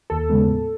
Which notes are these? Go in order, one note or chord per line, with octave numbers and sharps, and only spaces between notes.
D#2 A4
C#3 G#3 B3
A2